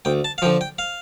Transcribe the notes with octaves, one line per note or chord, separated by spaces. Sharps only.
D2 G5
A5
F5
D3 F3 G5
G5
F5